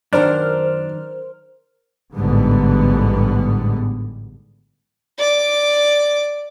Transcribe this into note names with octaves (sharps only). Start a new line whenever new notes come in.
F#2 D#3 D4 A#4 C5 F6
A1 G#2 D3 G3 B3
D5 D6